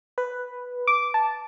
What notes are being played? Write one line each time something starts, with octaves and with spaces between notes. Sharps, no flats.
B4
D6
A5